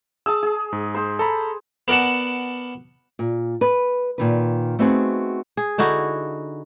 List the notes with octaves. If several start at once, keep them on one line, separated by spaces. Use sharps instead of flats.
G#4 A5 E6
G#4
G#2
G#4 C5
A4 A#5 B5
B3 A#4 D5 F#5 A5
A#2
B4
A#2 D#3 B4
A3 B3 C4 D#4 F#4 G#4
G#4
D3 D#4 E4 F#4